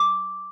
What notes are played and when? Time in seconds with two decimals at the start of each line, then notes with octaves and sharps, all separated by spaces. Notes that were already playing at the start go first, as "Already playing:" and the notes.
Already playing: D6